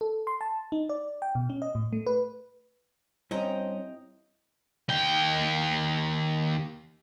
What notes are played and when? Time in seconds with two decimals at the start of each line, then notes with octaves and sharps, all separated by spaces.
0.01 A4
0.27 C6
0.41 A5
0.72 D#4
0.89 D5
1.22 G5
1.35 B2
1.50 C#4
1.62 D#5
1.75 A2
1.93 A3
2.07 B4
3.31 G2 C4 C#4 E4 C5 D#5 G5 A#5
4.89 D#2 G5